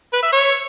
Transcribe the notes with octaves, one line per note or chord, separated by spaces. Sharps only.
B4
E5
C#5